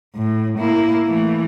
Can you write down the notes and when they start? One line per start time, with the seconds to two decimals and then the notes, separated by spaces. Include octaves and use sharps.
0.15 A2
0.59 A#3 E4
1.08 E3 A3